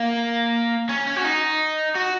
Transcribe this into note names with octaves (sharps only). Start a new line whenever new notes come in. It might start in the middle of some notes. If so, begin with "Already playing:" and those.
Already playing: A#3
C#4
C#4
F#4
D#4
F#4